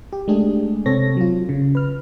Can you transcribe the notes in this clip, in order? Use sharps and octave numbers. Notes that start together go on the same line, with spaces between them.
G4
G#3 A3 D4 G4 G#4
C3 C4 A4 C#5 A#6
F#3 F4
C#3
B4 F6